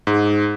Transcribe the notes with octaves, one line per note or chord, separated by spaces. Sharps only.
G#2